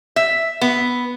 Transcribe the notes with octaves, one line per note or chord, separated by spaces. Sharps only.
E5
B3